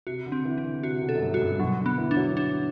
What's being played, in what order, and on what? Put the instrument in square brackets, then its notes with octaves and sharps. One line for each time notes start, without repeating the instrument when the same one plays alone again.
[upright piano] C3 [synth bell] F#4
[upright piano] D3
[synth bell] C4
[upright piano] E3
[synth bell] C4
[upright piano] D3
[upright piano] C3 [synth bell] F#4
[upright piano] B2
[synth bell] A4
[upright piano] F#2
G2
[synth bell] F#4
[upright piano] G2
[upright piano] B2 [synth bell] F#3
[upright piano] D3
[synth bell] B3
[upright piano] E3
[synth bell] D4
[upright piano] F#3
[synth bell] D4